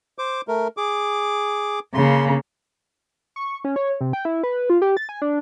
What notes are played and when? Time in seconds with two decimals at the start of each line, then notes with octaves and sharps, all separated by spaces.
0.19 C5 D6
0.48 A3 A#4
0.77 G#4 D6
1.94 C#3 A#3 C6
3.36 C#6
3.64 C#4
3.76 C#5
4.01 C3
4.13 G5
4.25 E4
4.43 B4
4.70 F4
4.82 G4
4.97 A6
5.09 G#5
5.22 D4